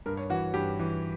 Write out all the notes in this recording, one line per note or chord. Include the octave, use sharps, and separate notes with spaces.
G2 A#4
C#5
E3 F#4
G2 G4
E3